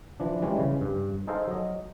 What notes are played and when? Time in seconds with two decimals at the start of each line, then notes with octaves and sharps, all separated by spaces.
0.20 E3 F3 D4
0.42 E3 G3 G#3 C#4
0.59 C#3
0.81 G2
1.27 D#4 G#4 A4 C5 D#5 F5
1.48 F#3 D#5